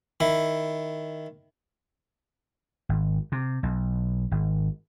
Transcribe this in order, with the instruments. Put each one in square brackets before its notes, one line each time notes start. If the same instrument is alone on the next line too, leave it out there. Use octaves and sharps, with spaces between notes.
[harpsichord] D#3 E4
[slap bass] G#1
C3
B1
G#1